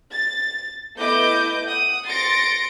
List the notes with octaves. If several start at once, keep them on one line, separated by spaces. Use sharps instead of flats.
A6
A3 B3 E4 D#5 D6 G6
F#5 D#6
C6 A6 A#6 C#7 D7